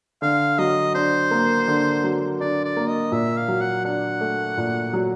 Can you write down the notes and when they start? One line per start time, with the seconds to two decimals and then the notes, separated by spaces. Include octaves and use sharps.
0.22 D3 F5
0.58 F#3 D#5
0.95 D4 C5
1.31 A#3
1.68 D3
2.04 F#3
2.40 D4 D5
2.64 D5
2.77 A#3
2.88 D#5
3.12 A#2 E5
3.37 F5
3.48 F#3
3.61 F#5
3.85 D4 F#5
4.21 A3
4.58 A#2
4.93 F#3